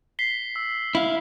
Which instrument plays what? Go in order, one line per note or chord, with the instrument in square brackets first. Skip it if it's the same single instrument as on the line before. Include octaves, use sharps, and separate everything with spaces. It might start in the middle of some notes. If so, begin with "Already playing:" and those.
[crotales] B6 C7 G7
E6
[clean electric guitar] E4 F5